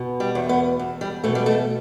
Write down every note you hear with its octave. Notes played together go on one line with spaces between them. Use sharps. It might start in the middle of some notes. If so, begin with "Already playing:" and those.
Already playing: B2
G3
E2
B3
E2
G3
B2 A3
G3
A3